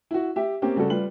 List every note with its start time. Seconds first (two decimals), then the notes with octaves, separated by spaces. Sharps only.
0.11 E4 F#4
0.36 G4 E5
0.62 A#3 C4 C#4 G4
0.76 C#3 G3 F#4 A4
0.90 G3 F4 B4 F#7